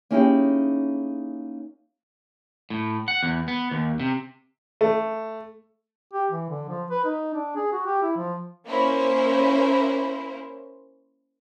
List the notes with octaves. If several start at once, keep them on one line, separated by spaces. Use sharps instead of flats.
A#3 C#4 D#4 E4 G4 G#4
A2
F#5
E2
B3
D#2
C3
A3
G4
E3
D3
F3
B4
D#4
D4
G#4
F#4
G4
E4
F3
A#3 C#4 E4 C5